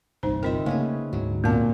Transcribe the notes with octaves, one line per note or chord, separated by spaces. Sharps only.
G1 C2 D#4 C5
C4 D#4 F4 A#4 E5
C#3 A3 A#3 C#4 G#4 B4
D2 G#2 D3 F#3
A#2 B3 C4 A5